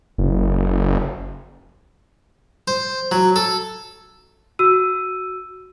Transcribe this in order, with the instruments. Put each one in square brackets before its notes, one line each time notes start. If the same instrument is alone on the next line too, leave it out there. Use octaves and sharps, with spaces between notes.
[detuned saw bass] F#1
[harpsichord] C5
F#3
A4
[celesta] F#4 E6 D#7